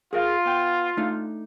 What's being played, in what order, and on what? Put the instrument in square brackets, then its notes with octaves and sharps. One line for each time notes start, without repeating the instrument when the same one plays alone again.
[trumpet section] F4 [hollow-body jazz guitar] G#4 A#4 F5
[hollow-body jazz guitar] B3 G5
A3 D4 D#4